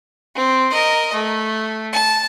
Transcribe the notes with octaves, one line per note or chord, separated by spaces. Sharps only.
C4
A#4 D#5
A3
A5